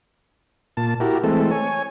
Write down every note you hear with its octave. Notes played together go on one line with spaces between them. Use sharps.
A#2 A5
E4 F#4 G4 A#4
E3 G#3 A3 C4 A4
C#5 G#5